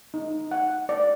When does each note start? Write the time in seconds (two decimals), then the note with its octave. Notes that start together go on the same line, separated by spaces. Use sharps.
0.14 D#4
0.51 F#5
0.89 D5